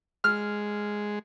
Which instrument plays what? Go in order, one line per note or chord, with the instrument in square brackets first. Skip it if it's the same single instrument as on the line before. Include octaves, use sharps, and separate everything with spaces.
[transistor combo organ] G#3 [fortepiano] F6